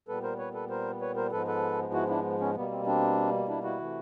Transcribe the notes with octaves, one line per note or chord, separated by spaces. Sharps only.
A#2 G3 B3 A4 B4
A#4 C5
B4 C#5
A4 B4
A#4 C5
B4 C#5
A#4 C5
G#2 F3 G#3 B3 A4 B4
A4 B4
E4 F#4
D4 E4
B3 C#4
B2 G3 A#3 B3
C4
C4 D4
D4 E4
E4 F#4
C3 E3 A3